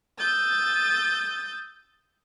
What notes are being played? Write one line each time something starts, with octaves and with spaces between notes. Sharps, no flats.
D#6 E6 G6 A6